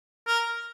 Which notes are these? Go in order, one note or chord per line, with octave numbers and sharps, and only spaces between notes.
A#4